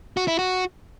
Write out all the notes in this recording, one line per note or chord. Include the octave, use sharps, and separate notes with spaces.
F#4
E4
F#4